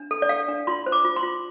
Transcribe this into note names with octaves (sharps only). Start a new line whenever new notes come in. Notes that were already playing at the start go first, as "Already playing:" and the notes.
Already playing: D4
A4
D5
A4 F5
D4
F4 C6
C5
D6
F4
C6
F4